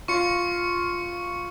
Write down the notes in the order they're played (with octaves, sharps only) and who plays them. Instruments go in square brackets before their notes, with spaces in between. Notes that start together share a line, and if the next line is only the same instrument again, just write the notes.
[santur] F4 [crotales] C#6 C#7